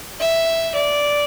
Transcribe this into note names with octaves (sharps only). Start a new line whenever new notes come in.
E5
D5